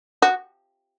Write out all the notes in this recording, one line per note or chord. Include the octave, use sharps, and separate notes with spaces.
F#4